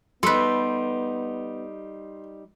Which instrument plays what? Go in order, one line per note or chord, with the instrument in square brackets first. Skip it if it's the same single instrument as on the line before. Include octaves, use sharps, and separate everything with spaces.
[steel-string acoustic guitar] G3 D#4 [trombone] B3 [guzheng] A4 B4 [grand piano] C6